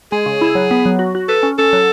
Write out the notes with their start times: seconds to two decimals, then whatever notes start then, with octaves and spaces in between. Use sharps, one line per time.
0.12 G#3 G#4
0.26 C#3
0.41 E4
0.55 F#3
0.71 B3
0.86 F#3
0.99 F#4
1.15 F#4
1.28 A4 B4
1.43 C#4
1.58 C#4 A4
1.73 F#3